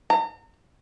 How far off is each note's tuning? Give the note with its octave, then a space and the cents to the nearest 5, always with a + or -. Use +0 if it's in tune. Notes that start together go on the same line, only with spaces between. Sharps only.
A#5 -40